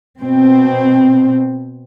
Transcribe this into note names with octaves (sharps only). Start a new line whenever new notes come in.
B2 C4